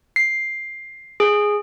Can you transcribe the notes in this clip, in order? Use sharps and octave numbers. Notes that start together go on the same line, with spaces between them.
C7
G#4